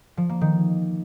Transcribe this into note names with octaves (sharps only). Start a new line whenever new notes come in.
F3
A#3
D#3